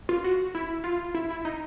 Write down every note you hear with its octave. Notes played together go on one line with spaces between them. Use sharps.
F4
F#4
E4
F4
E4
E4
D#4